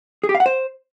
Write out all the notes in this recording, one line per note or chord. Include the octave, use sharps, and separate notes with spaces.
G#4
G4
F5
F#5
C5